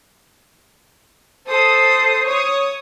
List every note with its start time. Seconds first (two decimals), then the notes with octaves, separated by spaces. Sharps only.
1.46 A4 C5 D#6
2.24 C#5 D#6